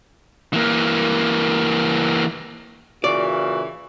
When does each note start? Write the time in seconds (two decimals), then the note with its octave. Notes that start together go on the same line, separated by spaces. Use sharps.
0.53 E3 A#3
3.04 A#2 C#3 E3 F#4 D5